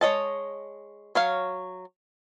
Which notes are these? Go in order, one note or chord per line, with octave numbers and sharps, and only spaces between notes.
G#3 C#5 D#5 A5
F#3 C#5 F5